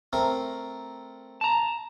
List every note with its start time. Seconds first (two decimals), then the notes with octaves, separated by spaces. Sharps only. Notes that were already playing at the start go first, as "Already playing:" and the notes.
0.13 A3 C4 A#4
1.41 A5 A#5